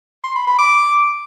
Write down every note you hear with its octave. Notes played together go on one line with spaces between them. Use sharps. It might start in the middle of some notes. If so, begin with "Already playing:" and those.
C6
B5
B5
D6